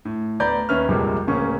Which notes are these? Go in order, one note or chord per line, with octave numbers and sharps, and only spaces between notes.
A2
D2 B3 D5 A#5 B5 G6
D#2 C#4 B4 E5 F6
A#1 F2 C3 G3 G#3 A#3
D1 C#3 A#3 C#4 C#6